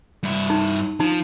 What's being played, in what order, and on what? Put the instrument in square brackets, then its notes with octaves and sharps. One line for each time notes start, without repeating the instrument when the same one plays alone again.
[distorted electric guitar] G2 E4
[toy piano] D#4
[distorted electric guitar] F3 [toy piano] D#4 A5